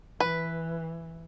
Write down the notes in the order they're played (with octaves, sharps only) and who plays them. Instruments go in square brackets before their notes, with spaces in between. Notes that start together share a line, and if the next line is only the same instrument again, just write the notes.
[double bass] E3 [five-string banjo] B4